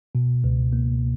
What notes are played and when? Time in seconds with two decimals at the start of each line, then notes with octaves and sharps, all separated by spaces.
0.15 B2
0.44 C#2
0.73 A#3